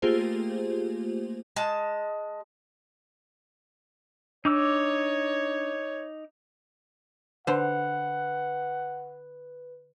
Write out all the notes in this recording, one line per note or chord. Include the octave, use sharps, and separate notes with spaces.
A3 A#3 F4 G4 G#4 C5
G#3 A5
D4 D#4 C#5 D6 E6
D3 B4 C5 F#5